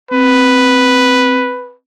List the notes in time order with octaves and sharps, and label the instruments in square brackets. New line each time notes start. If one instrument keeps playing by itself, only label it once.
[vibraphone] C4 [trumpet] B4